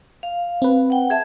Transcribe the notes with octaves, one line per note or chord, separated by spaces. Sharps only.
F5
C4 B4
F#5 G5
G#4 E5 A5